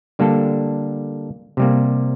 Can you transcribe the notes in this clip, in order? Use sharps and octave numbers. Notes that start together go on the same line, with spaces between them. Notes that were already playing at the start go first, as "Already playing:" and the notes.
D3 G3 A#3 D4 A4
C3 G3 A#3